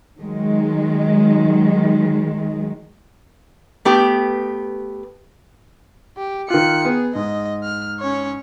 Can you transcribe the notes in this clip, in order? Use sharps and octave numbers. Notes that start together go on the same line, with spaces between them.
D#3 F#3 G#3
A3 B3 G4
G4
D#3 F4 F#6 C#7
B3 G#4
G#2 D#5
F6
C#4 C#5